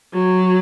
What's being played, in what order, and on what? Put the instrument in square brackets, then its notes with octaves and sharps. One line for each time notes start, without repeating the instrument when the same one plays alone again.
[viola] F#3